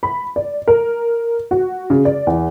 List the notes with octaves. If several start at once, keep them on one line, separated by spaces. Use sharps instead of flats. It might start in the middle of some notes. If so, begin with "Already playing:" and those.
B5
D5
A#4
F#4
C#3
D5
E2